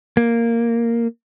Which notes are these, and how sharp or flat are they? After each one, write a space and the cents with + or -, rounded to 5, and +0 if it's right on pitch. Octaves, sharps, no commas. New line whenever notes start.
A#3 -5